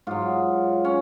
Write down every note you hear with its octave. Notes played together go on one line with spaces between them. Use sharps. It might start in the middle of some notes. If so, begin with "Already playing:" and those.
G#2 F#3 F4
C#4